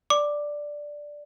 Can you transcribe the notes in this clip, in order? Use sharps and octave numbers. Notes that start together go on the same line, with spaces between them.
D5 D6